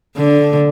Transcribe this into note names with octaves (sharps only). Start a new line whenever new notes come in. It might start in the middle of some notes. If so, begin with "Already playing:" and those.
D3